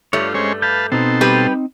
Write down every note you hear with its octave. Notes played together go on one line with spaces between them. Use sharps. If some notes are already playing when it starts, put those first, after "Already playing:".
G2 G3 A3 F4 C#5
G#3 C#4 C5 C#5
B4 F5 A5 G6
B2 C4 D#4 A4 C5
G3 G4 B4